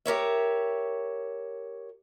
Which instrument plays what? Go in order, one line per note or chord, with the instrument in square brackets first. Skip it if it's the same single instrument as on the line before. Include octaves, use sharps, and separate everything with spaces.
[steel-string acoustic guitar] G4 A#4 C#5 E5